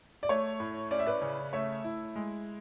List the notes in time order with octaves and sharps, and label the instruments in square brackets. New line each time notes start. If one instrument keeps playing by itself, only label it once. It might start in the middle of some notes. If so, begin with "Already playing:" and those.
[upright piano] D5
A3 C#5
A2
C#4 D5
E5
B4 D5
C#3
A3 C#5 E5
E4
G#3